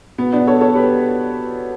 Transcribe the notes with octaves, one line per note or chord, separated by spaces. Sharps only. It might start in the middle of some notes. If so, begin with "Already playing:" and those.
B2 B3
B3 D4
A4 C#5
A4 C#5
G4 B4